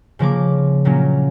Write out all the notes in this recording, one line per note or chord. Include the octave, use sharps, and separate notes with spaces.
C#3 F3 A#3 D6
A#2 F#3 A#3 C#4